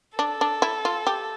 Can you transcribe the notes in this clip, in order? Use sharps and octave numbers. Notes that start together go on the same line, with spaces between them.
D4 A4
D4
E4
F4
G4